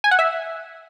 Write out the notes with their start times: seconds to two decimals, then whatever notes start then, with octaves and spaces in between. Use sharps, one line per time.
0.04 G#5
0.11 F#5
0.19 E5